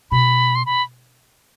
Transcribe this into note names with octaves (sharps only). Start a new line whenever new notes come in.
B2 B5
C6
B5